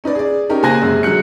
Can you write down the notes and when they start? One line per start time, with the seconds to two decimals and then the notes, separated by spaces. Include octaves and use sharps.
0.04 C#4 D#4 B4 D5
0.15 G#4 D5
0.49 C#4 D#4 G4 A#4
0.63 C#3 A#3 C5 G#5 F#6 A#6
0.81 F#2 C3 G#3 C#4
1.03 D3 F#3 G#3 F#6 C#7